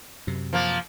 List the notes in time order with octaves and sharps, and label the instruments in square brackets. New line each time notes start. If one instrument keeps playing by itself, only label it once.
[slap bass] F#2 C3
[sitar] F3 A#3